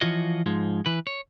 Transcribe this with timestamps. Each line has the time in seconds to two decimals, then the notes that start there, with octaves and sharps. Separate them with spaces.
0.01 E3 F3 F4 F#4 C#5 D#5
0.46 G#2 F3 G#3
0.86 E3 B4
1.07 C#5